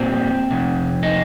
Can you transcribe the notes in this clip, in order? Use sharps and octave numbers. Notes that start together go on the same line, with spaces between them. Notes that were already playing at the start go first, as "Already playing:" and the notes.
Already playing: A#2 G3 C4
F2 C3
D#4